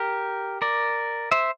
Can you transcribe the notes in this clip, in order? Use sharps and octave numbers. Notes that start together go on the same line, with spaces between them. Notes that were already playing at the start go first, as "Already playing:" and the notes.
Already playing: G4 A#4
A#4 D5
C5 E5